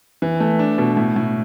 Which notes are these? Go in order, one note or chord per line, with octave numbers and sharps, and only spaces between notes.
E3
A3
D4
B2
A2
A2